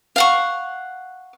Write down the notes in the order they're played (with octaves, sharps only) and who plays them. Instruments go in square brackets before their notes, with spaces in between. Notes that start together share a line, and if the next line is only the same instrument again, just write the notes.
[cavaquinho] F5 F#5 C#6